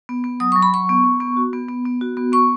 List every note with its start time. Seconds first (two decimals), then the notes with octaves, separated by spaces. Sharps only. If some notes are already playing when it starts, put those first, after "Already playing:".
0.09 B3
0.24 B3
0.40 F#3 D#6
0.52 F#3 C#6
0.62 B5
0.73 F#3 C#6
0.89 B3
1.04 B3
1.20 B3
1.37 F#4
1.53 B3
1.69 B3
1.85 B3
2.01 F#4
2.17 B3
2.32 B3 C#6